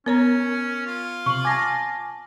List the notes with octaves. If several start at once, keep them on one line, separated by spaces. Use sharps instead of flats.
B3 C#4 A#4 C#5 A#5
F4
C3 C#6 F#7
G#5 A5 D6 A#6